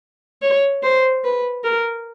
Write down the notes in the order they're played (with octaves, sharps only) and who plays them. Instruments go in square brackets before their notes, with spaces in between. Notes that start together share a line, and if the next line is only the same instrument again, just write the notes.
[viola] C#5
C5
B4
A#4